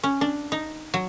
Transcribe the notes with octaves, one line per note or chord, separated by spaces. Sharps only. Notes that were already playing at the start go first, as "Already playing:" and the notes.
C#4
D4
D#4
F#3